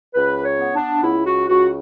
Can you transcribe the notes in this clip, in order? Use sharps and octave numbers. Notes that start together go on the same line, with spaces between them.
C#2 B4
C#5
B3
D4
C#2 E4
F#4
C#2 F#4